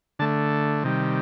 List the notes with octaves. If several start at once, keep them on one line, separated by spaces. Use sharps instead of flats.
D3 A3 A5
C3 D#3 G3